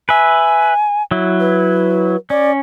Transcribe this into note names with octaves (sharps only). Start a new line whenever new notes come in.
B4 E5 G#5
F#3 E4
B4
C#4 D5